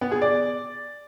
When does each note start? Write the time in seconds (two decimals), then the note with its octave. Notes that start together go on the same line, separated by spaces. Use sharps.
0.01 B3
0.11 G#4
0.21 D5